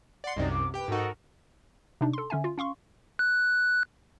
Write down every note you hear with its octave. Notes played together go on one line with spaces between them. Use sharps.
D5 F#5 C6
C2 F#2 C3 D#4 D5 D#5
D6
G4 B4 G5
G#2 D#4 F#4 A4 A#4
C3 D4 D#4
A4 C6
D3 C#4 E5 G#5
F4
C#4 F5 C6 C#6
F#6